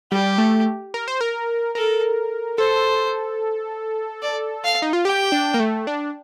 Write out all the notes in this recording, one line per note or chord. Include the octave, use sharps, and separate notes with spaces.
G3 G4
A3
A#4
C5
A#4
A4 A#4
A4 C5
D5
F5
D#4
F4
G4 G5
D4
A#3
A3
D4